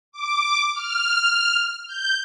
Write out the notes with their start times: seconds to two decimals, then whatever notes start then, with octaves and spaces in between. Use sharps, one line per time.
0.12 D6
0.73 F6
1.87 G6